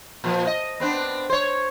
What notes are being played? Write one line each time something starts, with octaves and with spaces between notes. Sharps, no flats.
A#2 F3
D#5
B3 C4 D4
C5 C#5